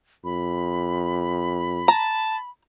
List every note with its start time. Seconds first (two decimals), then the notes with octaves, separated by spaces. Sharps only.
0.24 F2 B5
1.88 A5 A#5